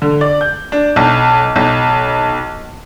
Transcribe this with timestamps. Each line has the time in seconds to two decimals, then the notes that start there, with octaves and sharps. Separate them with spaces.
0.02 D3
0.21 D5
0.41 G6
0.72 D4
0.96 B1
1.56 B1